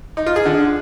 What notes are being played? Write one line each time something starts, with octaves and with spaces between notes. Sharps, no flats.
D#4
F4
G#4
D3